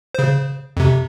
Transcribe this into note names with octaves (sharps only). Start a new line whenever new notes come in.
C#3 C5
F2 C3